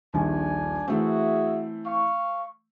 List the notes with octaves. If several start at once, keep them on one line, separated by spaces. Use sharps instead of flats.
D#1 A#1 D#3 D4 G#5
E3 A3 C4 F#4 G#4 E5
F5 C#6